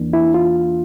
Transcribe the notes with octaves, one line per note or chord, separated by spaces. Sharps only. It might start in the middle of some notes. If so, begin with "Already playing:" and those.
Already playing: E2 E3 A#3 D4
E4
F4